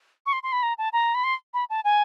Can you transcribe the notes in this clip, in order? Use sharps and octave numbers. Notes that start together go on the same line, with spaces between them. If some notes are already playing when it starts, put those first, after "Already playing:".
C#6
C6
C6
B5
A#5
A5
A#5
B5
C6
B5
A5
G#5